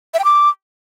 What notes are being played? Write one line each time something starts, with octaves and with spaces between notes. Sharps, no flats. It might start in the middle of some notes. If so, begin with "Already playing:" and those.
E5
G5
D6